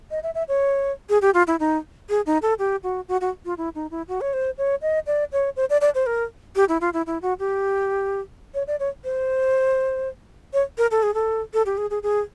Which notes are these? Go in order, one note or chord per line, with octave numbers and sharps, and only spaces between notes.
D#5
E5
E5
C#5
G#4
G4
F4
E4
D#4
G#4
D#4
A4
G4
F#4
F#4
F#4
F4
E4
D#4
E4
F#4
C#5
C5
C#5
D#5
D5
C#5
C5
D5
D5
C5
A#4
G4
E4
F4
E4
E4
F#4
G4
C#5
D5
C#5
C5
C#5
A#4
A4
G#4
A4
A4
G4
G#4
G#4
G#4